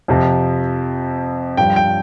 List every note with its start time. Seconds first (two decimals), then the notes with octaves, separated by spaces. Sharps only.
0.08 F2 C3 F3
1.57 G2 F3 G5
1.76 G5